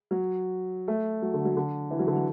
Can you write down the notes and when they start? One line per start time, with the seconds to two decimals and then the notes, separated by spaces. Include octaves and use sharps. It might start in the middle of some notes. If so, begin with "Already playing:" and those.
0.11 F#3
0.88 A3
1.22 F#3
1.34 D3
1.45 F#3
1.56 D3
1.91 E3
1.99 F#3
2.07 D3
2.17 F#3